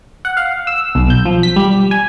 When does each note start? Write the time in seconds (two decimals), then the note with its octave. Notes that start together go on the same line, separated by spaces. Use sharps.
0.25 F#5
0.37 F5
0.67 E6
0.95 B1
1.10 G6
1.26 F3
1.43 B6
1.56 G3
1.91 G#5